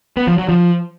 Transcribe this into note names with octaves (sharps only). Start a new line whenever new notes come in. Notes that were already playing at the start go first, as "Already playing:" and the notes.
B3
F3
F#3
F3